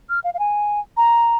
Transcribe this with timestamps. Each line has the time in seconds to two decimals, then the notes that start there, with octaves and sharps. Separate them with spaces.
0.09 F6
0.24 F5
0.34 F5
0.39 G#5
0.97 A#5